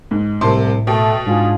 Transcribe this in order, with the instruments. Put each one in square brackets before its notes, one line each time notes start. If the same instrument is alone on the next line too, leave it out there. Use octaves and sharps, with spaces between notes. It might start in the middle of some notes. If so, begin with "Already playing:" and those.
[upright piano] G#2
[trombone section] C2 [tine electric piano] A2 [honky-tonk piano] C3 [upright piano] A#4 A5 C6
[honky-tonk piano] B2 [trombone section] A3 [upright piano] G5
[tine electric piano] G#2 [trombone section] D4 F4 G#4